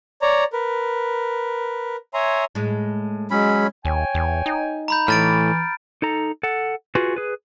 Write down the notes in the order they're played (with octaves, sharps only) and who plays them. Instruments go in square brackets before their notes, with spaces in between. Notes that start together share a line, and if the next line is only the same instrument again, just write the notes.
[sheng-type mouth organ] C#5 D5 A#5
A#4 B4
C#5 E5 G#5 A#5 C6
[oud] A2 G#3
[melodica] F#3 C#4 B5 [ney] G#3
[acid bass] D#2 [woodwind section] C#5 G5 G#5
[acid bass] E2
D#4
[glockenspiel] A#5 B5 G6
[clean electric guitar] A2 [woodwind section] E3 [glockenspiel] F6 A6 D7
[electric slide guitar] D#4 A4 A#5
A4 F#5
F4 F#4 G#4 B4
G#4 B4